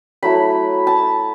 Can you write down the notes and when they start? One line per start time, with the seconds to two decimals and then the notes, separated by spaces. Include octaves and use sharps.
0.23 F#3 A3 E4 B5
0.87 A5